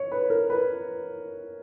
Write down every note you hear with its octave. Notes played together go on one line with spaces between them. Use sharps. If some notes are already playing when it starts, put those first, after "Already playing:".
Already playing: C#5
B4
A#4
B4